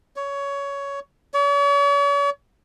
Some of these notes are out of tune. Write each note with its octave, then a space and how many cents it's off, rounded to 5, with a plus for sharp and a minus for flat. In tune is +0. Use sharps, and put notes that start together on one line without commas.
C#5 +15
C#5 +45